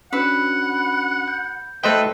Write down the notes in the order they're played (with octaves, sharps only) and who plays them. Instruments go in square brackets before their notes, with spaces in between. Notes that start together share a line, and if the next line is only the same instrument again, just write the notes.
[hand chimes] C#4 D4 F#4 [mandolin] B4 E6 [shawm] F#5
[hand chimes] G6
[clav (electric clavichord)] A3 C5 G5 [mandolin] D#4 F#4 E6 [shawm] B4